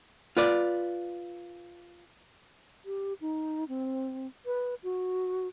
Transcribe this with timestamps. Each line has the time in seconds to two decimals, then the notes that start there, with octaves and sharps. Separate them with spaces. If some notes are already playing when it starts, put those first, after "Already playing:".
0.37 F4 B4 D5
2.85 G4
3.21 D#4
3.69 C4
4.46 B4
4.83 F#4